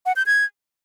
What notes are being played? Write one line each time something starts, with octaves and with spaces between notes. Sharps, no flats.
F#5
G6
G#6